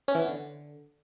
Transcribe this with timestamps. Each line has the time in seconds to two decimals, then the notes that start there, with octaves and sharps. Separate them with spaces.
0.08 C#4
0.15 E3
0.22 B3
0.28 D3